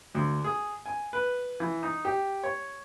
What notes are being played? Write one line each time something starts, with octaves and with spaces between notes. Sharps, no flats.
D2
G#4
G#5
B4
E3
D#4
G4
C#5